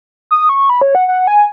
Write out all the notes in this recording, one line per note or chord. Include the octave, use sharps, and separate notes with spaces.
D#6
C#6
B5
C#5
F#5
F#5
G#5